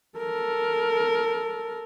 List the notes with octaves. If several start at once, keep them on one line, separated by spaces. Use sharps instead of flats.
A4 A#4